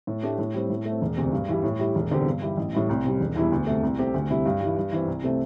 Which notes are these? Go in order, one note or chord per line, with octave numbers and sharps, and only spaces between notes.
A2
A3 D4 G4
A2
G3 C4
A2
A3 C4
E1
D2 C3
G2
E3 G3
A2
G3 E4 G4
E1
E2 D3 C4 G4
G2
G3 E4 G4
A1
A2 G3 E4
C2
C3 G3
E1
E2 E3 G3 E4
D2
C3 A3
C2
C3 A3 C4 G4
D2
C3 G3 E4
G2
E3 G3
G2
E3 C4
C2
C3 A3 C4